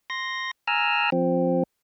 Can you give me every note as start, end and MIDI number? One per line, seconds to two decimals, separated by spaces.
0.10 0.51 84
0.10 0.51 94
0.68 1.10 80
0.68 1.10 82
0.68 1.10 88
0.68 1.10 89
1.12 1.63 53
1.12 1.63 60